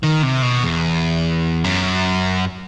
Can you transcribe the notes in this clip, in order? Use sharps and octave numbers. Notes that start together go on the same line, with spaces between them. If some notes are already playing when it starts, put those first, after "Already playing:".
D#3
C3
B2
E2
F#2